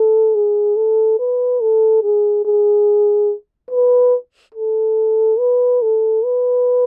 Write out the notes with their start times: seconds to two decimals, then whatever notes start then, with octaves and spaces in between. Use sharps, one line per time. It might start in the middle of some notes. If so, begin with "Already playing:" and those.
Already playing: A4
0.35 G#4
0.76 A4
1.19 B4
1.61 A4
2.03 G#4
2.45 G#4
3.71 B4
4.55 A4
5.39 B4
5.82 A4
6.24 B4